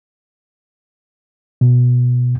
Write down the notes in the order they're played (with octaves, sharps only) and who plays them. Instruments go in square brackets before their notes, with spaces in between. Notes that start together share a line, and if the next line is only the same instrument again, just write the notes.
[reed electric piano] B2